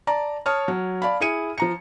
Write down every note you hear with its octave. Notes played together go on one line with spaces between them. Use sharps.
D5 A5 A#5
C#5 A5 D#6 F6
F#3
D5 F5 A5 B5
E4 G#4 C#7 D#7
F3 A#5 C#7